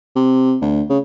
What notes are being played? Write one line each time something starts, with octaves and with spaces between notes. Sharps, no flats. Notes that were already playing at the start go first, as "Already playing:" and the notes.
C3
D2
C#3